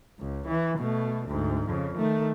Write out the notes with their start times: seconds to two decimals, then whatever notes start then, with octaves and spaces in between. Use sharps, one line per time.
0.19 C#2
0.47 E3
0.78 B2 A3
1.26 D2 G#2
1.68 F2 C#3
1.97 D#3 A3